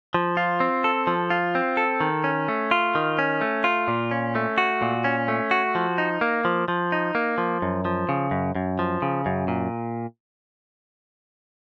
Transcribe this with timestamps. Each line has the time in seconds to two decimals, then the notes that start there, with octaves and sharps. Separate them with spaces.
0.14 F3
0.37 F4
0.60 C4
0.84 A4
1.07 F3
1.30 F4
1.55 C4
1.77 A4
2.01 D#3
2.24 C#4
2.48 A3
2.71 F4
2.95 D#3
3.19 C#4
3.41 A3
3.64 F4
3.88 A#2
4.11 C#4
4.35 A3
4.58 F#4
4.82 A#2
5.04 C#4
5.28 A3
5.51 F#4
5.75 F3
5.98 D#4
6.21 A#3
6.45 F3
6.68 F3
6.92 D#4
7.15 A#3
7.38 F3
7.62 F#2
7.85 F3
8.09 C#3
8.31 F#2
8.55 F#2
8.79 F3
9.02 C#3
9.26 F#2
9.48 A#2